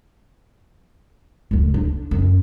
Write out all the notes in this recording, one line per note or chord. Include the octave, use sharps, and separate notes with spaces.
F#1 D2
D4
F#2